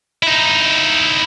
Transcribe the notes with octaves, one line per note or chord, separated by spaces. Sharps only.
D#4 E4